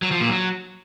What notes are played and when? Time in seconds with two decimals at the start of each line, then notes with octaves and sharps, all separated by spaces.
0.02 F#3
0.11 F3
0.20 A#2
0.29 F#3